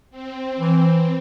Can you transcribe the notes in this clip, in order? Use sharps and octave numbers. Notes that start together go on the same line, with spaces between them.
C4
E3